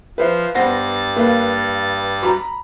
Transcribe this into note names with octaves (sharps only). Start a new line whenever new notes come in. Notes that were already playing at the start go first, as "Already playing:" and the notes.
F3 B4 C5 E5
G2 B3 C5 F#5 A6 A#6
A#3 A#4 B4 F5
F#4 A#5 B5